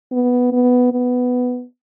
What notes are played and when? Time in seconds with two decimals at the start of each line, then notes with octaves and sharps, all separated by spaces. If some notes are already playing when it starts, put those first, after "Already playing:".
0.12 B3
0.52 B3
0.92 B3